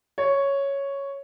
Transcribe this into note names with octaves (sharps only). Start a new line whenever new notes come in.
C#5